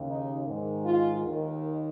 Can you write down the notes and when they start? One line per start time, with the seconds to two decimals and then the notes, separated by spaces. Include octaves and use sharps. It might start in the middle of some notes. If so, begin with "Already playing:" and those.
Already playing: D#2 C#3
0.08 D#4
0.48 G#2 D#3
0.86 F4
1.25 D#2 D#3